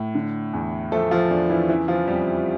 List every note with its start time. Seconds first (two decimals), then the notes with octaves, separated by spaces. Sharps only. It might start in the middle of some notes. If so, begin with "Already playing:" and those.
Already playing: A2
0.15 D3
0.53 E2
0.92 F3 A3 A4
1.11 F3 F4
1.30 E2 D4
1.50 E3 E4
1.69 C#3 E3 E4
1.88 F3 F4
2.07 F2 G3 G4